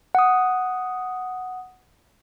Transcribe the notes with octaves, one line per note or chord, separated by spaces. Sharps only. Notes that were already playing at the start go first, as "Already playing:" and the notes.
F#5 D#6